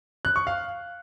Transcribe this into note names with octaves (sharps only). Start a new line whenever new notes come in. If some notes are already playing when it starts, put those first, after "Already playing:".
F#6
C#6
F5